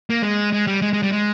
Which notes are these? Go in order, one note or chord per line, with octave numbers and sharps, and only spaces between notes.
A#3
G#3
G#3
G3
G#3
G#3
G3
G#3